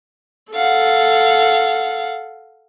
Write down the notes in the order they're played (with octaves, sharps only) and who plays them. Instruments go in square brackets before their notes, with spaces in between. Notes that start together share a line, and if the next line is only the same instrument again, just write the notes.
[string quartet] A4 F5 F#5